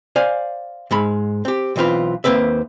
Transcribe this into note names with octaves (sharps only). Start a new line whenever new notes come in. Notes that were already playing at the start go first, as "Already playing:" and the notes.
C5 D5 F5 G#5
G#2 G#3 B5
C4 G4
B1 E3 C4 F4 B4
D#2 D3 A#3 C4 B4 E5